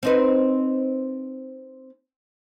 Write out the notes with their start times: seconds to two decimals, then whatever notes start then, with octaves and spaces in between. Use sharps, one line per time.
0.03 C4 D#4 B4